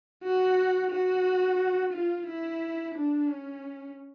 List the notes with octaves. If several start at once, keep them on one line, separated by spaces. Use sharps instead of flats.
F#4
F#4
F4
E4
D4
C#4